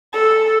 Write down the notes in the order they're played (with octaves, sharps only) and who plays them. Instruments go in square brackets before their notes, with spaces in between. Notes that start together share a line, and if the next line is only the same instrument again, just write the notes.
[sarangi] A4